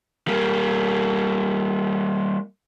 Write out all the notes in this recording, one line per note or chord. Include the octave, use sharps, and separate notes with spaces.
G3 A#3